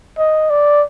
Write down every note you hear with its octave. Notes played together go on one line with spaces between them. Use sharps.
D#5
D5